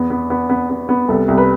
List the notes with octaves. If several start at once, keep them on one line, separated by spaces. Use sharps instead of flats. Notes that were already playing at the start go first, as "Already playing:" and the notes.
Already playing: E2 B3
B3
B3
B3
B3
B3
C2 A4
C2
B4